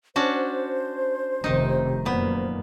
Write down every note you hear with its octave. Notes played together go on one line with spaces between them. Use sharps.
C#4 D4 F#4 C5
F1 C3 D#3 D#4
F#2 A#2 A#3 B3